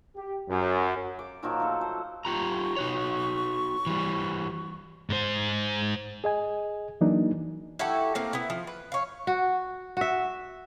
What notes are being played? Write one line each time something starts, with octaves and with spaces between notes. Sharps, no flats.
G4
F#2
D6
A#2 D#3 F3 F#3
A3 A4
C5
F4 G4 A#5 C#6
D#4 F#4 C#5
E3 G3
G#2 C5
G#4 D#5 G#5
E3 F#3 A#3 D4 D#4
E4 F#4 G4 A4
A3 A#3 C4
B3 E4
F3
B4
C#5 F5
F#4
F#4 E5